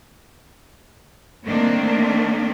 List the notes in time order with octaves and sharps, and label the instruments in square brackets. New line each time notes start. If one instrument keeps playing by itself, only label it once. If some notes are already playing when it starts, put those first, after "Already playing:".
[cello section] D#3 A3 A#3 C4 D4